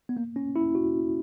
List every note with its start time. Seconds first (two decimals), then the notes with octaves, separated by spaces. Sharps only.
0.09 B3
0.17 A#3
0.36 C#4
0.56 E4
0.75 F#4